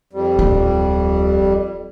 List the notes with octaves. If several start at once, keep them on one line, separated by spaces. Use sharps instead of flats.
F2 G3
D1 F4